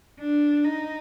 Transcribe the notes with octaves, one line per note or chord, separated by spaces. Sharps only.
D4
D#4